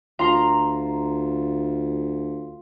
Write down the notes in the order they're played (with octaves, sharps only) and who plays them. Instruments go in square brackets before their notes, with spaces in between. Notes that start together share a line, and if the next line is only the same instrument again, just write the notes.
[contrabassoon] D2 [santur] F4 [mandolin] A#5 C6